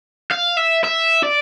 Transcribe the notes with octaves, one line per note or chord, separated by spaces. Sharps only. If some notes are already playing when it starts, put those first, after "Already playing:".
F5
E5
E5
D5